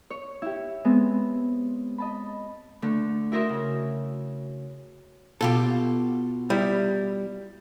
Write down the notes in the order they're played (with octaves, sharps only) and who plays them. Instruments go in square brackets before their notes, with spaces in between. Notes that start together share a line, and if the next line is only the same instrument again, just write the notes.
[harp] C#5
E4 G4
G#3 B3 C4
D#5 A5 B5
D3 A3 D4
E4 F#4 A#4 C5 D#5 E5
C#3
[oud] B2 F4 G4 [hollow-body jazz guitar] A4
[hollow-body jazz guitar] G3 E4